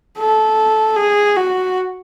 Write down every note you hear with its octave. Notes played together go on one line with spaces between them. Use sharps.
A4
G#4
F#4